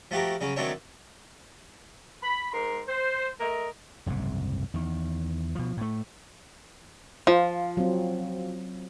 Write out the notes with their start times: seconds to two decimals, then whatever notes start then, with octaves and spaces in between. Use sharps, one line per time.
0.11 F3 A3 F#4 G4 A#4
0.41 C#3 F#3 C#4
0.56 D#3 F#3 A3 C4 D4 C#5
2.23 B5
2.53 G#2 A#4 C6
2.87 C5
3.40 A3 A#4 D#5
4.06 F#1 C2 G#2 C3
4.74 E2 D#3
5.55 B2 F3
5.77 A2 A3
7.27 F3 F4
7.77 F#3 C4